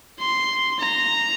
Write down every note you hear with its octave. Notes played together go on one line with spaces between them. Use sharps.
C6
A#5